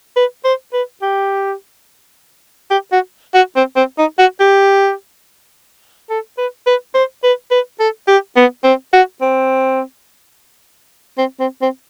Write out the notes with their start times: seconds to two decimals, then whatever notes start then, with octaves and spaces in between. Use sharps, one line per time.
0.16 B4
0.44 C5
0.73 B4
1.02 G4
2.71 G4
2.92 F#4
3.35 F#4
3.56 C4
3.76 C4
3.98 D#4
4.19 F#4
4.40 G4
6.10 A4
6.38 B4
6.67 B4
6.95 C5
7.24 B4
7.51 B4
7.80 A4
8.08 G4
8.36 B3
8.64 C4
8.93 F#4
9.21 C4
11.18 C4
11.40 C4
11.62 C4